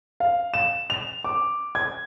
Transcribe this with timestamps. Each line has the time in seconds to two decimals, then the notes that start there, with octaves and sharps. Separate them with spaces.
0.20 F5
0.54 E7
0.90 F7
1.24 D6
1.75 G#6